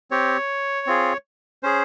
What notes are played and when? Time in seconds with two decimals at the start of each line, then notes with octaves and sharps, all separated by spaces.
0.11 C4 G4 C#5
0.87 C4 F4 G#4
1.63 C#4 G#4 C5